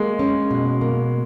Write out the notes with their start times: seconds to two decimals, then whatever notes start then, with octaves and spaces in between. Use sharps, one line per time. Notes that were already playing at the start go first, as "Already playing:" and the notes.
Already playing: G#3 A#3
0.19 C#4
0.51 B2
0.81 A#3